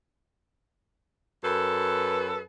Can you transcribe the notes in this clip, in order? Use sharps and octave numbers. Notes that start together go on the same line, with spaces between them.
F#2 A4 B4